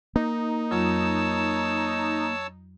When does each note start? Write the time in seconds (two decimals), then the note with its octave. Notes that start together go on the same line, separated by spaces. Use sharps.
0.16 A#3 D#4
0.71 F2 F#3 F4 C#5 A5 E6